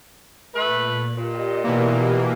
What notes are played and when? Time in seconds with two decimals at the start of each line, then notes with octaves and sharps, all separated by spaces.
0.54 A#2 A3 B4
1.17 A#2 G4 D#5
1.64 B2 E3 A#3